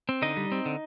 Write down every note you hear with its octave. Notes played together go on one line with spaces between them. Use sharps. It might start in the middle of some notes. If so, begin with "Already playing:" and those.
C4
D3 D#4 D#5
G3
C4
D3